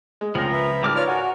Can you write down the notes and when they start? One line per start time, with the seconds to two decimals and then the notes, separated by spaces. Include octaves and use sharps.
0.21 G#3
0.35 C#2 F3 C4 A#4
0.52 B4 E5
0.83 G#1 G3 D6 F6
0.96 F4 A#4 B4 C#5 D5 F6
1.08 F#4 F#5 G#5